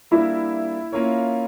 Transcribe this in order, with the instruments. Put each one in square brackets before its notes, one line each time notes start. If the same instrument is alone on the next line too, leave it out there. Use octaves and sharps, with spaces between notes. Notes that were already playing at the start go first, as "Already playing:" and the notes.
[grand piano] G3 A#3 D4 [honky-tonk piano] E4
[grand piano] A#3 C#4 F4 A#4 C#5